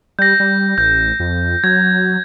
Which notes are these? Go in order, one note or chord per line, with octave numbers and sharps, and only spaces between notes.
G3 G6 A#6
G3
A1 G6
F2
F#3 G#6